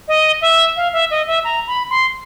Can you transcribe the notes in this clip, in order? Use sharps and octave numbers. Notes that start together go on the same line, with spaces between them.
D#5
E5
F5
E5
D#5
E5
A#5
B5
C6